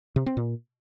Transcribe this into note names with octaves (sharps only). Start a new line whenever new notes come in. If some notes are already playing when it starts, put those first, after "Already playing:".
C3
C4
A#2